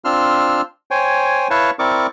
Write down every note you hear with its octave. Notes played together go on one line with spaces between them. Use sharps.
C4 D4 F4 C6 E6 F6
C5 C#5 G5 G#5
E4 B4 C#5 F5 A5 C#6
C4 E4 A#4 D5 C#6 D6